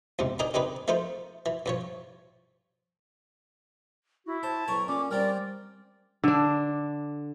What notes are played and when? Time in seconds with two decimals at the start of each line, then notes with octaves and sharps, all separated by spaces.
0.19 E2 G#2 C3
0.39 D4 D#4 A#4 D#5 G#5 A#5
0.54 C3 D#3 D4 D#4 G#4 B4
0.88 F3 A3 D#4 A#4 C5
1.46 E3
1.66 G2 F3 C#5
4.26 E4 F#4
4.43 C5 A5
4.68 B1 A#4 C#6
4.88 A#2 C#4 D6
5.11 G3 C4 G4 A#4 D5
6.24 D3 D4